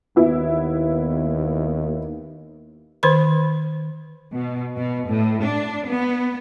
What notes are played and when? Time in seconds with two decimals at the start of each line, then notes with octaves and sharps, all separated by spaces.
0.16 D#2 B3 E4
3.03 D#3 B4 C5 B5
4.33 B2
4.76 B2
5.08 A2
5.43 D4
5.86 B3